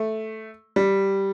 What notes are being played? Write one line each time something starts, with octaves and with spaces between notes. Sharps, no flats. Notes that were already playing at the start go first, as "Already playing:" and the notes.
Already playing: A3
G3